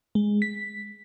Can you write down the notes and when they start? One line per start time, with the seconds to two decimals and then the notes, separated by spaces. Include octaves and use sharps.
0.15 G#3
0.42 B6